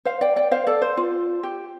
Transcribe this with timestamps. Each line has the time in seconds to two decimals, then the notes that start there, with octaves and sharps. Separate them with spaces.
0.05 C5 F5
0.21 D5 G5
0.36 D5 G5
0.51 C5 F5
0.67 A4 D5
0.82 C5
0.97 F4
1.43 G4